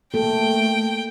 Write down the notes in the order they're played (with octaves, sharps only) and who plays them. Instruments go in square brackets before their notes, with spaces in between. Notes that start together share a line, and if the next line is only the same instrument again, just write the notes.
[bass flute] A3 [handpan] A#3 A4 [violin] G5